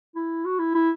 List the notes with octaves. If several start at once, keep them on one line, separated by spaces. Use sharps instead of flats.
E4
F#4
E4
E4